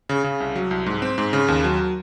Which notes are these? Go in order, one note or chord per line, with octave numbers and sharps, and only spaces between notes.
C#3
C#3
C2
F#3
C2
G#2
C4
G#2
C#3
D#2
F#3